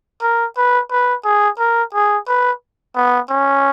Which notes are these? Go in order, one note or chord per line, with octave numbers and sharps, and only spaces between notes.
A#4
B4
B4
G#4
A#4
G#4
B4
B3
C#4